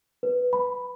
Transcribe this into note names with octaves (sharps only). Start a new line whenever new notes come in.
B4
B5